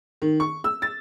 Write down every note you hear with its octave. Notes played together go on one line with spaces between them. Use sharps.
D#3
C#6
E6
A6